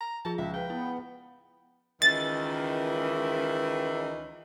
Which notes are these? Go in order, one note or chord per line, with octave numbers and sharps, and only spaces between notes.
A#5
F3 F4 G#4 A5
C#2 E5
B4 F5 G5
B3 E4
C#2 D#3 E3 A6